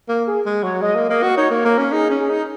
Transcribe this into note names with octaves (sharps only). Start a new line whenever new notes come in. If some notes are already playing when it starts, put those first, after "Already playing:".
A#3
G#4
G#3
F#3 C#5
G#3 D#5
A#3
A#3 D#5
F#4
D#4 C#5
A#3
C#5
A#3 A#4
C#4
D#4 G#4
C#4
G#4
D#4